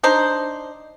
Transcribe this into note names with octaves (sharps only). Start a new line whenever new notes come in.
D4 D#4 C5